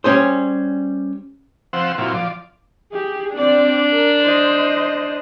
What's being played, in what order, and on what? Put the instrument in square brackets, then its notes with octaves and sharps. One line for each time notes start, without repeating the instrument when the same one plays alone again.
[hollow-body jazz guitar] G3 C#4 G#4 C5
[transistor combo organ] F3 C4 C5 F#5 E6
A#2 F#3 C4 E4 F4
F3 D5
[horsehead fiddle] G4 G#4
[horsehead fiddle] C4 D5 [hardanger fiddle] D4
[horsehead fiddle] A#4
C5 D#5